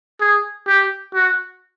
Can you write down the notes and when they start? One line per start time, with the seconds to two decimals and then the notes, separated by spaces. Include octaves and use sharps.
0.20 G#4
0.68 G4
1.15 F#4